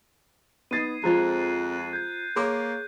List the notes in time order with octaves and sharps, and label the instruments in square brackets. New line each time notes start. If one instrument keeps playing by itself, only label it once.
[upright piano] B3 D#4 A6 [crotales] G#6 C7 D#7
[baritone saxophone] F2 [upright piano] F3 G#3 [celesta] F4 C5 A#5 [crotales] F#6 A6
[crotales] G6 G#6
[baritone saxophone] A#3 [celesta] G#4 [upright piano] C#5 C6 D6